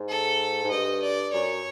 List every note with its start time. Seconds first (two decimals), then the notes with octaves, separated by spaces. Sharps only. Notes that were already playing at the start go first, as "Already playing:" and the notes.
Already playing: G#2
0.09 A4
0.64 G#2
0.71 G2 D#5
1.03 D5
1.33 F#2 C#5